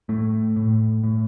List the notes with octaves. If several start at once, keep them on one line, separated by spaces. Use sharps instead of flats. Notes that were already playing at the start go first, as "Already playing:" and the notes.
A2 A3
A2
A2